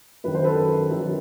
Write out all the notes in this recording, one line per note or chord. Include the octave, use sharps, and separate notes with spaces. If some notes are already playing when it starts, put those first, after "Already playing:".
F#2 D#3 B4
C5
A4 B4
F#2 D#3